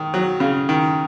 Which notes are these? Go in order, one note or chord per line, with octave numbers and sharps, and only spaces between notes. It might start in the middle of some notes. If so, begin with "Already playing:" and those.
Already playing: D#3
F#3
C#3
D#3